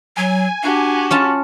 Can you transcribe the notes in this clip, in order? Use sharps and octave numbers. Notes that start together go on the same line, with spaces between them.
F#3 G#5
D4 F#4 G4
C#4 F4 A5